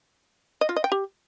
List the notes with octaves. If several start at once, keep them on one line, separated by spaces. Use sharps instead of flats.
D#5
F4
D#5
G5
G4